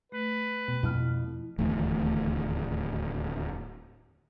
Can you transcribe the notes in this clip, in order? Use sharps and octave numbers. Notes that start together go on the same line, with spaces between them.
A3 B4
B2
F2 E4 F6
D1 D#2 A2 E3